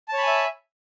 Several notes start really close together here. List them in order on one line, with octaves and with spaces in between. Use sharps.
A5 C#5 B5 G#5 E5